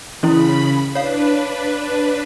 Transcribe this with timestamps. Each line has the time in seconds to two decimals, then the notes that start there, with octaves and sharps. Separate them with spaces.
0.23 C#3 E3 C#4 E4 B5
0.95 D4 B4 C#5 F5